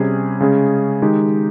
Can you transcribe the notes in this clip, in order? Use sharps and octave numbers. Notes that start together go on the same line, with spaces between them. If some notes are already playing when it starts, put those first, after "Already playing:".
Already playing: C3 G3 C#4 G#4
C#3 G#3 C#4 G#4
D#3 G#3 D#4 G4